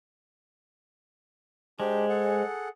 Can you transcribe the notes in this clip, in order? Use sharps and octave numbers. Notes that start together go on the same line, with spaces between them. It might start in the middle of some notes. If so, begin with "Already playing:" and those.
G#3 D4 G4 C5
G#4 A4 F#5